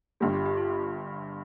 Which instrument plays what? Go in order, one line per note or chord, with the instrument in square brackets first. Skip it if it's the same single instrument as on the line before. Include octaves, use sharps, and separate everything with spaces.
[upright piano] G1 G2 G3 [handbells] F4
[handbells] G4
G4
F4